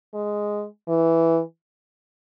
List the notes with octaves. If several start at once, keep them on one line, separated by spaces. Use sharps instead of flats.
G#3
E3